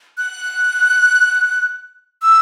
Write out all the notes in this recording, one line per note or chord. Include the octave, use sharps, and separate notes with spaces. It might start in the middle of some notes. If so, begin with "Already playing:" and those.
F#6
E6